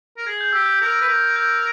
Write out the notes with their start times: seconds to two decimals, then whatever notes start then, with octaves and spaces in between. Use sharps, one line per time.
0.17 A#4
0.27 G#4 G#6
0.41 G6
0.53 G4 E6
0.66 G6
0.81 A#4
1.01 B4
1.09 A#4
1.36 G6